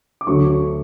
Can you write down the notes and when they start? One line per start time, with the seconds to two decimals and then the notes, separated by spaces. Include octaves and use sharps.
0.21 D6
0.27 D2 D3 F#3 A3 C#6